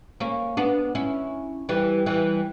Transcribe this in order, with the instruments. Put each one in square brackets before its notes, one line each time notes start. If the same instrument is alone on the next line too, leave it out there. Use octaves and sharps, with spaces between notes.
[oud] A#3 C#4
B3 D4
C#4 E4
E3 G3
E3 G3